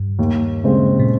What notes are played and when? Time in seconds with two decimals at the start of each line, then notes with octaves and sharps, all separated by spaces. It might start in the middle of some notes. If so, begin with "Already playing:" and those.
Already playing: G2
0.19 D#2
0.64 C#3 G#3 C4
0.99 A#2